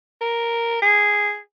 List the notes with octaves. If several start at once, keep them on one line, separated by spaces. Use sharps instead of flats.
A#4
G#4